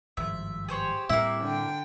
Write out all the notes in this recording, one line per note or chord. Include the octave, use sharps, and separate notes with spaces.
G#1 G2 F3 E5
G4 G#4 C5 C#5
A2 G3 A#3 C4 E4 E5
D3 G5